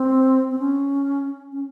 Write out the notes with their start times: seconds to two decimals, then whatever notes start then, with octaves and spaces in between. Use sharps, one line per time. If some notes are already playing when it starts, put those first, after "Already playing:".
Already playing: C4
0.51 C4
0.59 C#4
1.52 C#4